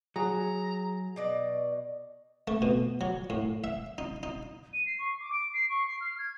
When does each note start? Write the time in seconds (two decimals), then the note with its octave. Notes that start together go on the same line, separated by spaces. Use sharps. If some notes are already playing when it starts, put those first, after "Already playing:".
0.16 F#3 G#4 A#5
1.16 B2 D5 D#5
2.48 A3
2.62 B2
3.01 F#3
3.30 A2
3.64 E5
3.98 D#4
4.23 D#4
4.73 D#7
4.86 C7
4.99 C#6
5.20 D6
5.33 D7
5.54 C7
5.70 C#6
5.88 C7
6.01 F6
6.19 G#6